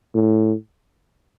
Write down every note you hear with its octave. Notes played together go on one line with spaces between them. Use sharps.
A2